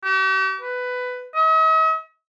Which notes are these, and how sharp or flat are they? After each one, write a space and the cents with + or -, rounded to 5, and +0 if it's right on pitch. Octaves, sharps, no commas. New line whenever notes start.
G4 -45
B4 +15
D#5 +45